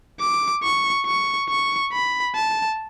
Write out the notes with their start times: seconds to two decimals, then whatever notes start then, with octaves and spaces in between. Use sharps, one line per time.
0.20 D6
0.63 C#6
1.06 C#6
1.49 C#6
1.93 B5
2.35 A5